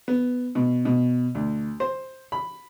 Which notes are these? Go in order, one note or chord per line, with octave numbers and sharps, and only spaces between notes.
B3
B2
B2
D2
C5
B5